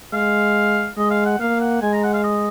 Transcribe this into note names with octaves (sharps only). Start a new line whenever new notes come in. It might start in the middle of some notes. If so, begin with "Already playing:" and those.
G#3 F5
G#3 D#5
F5
F#5
A#3 F5
F#5
G#3 G#5
A#5
F#5
F5
D#5